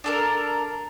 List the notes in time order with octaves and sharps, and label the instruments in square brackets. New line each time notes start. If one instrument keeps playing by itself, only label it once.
[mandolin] D4 A4 A#4